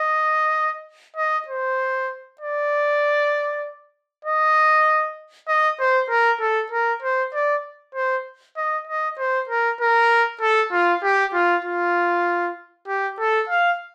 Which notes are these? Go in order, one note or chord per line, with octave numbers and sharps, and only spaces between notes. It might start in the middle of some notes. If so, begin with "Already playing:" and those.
Already playing: D#5
D#5
C5
D5
D#5
D#5
C5
A#4
A4
A#4
C5
D5
C5
D#5
D#5
C5
A#4
A#4
A4
F4
G4
F4
F4
G4
A4
F5